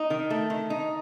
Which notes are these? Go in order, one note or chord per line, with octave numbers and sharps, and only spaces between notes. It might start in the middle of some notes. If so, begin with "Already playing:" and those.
Already playing: D#4
D#3
A3
D#3
D#4